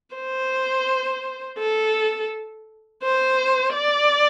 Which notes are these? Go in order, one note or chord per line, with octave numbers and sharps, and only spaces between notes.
C5
A4
C5
D5